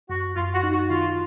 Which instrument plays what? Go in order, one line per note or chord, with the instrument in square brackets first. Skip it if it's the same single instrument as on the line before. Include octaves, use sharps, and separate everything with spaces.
[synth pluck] F#2 [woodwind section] F#4
[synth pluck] F#2 [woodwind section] F4
[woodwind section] F#4
[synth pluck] D#4
[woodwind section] F#4
[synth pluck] D#3 [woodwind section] F4